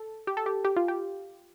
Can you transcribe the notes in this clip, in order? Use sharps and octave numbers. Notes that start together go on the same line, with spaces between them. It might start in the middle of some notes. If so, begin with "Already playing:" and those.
Already playing: A4
G4
A4
G4
G4
F4
G4